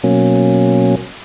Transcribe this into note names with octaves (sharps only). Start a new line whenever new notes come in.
B2 F#3 A#3 C#4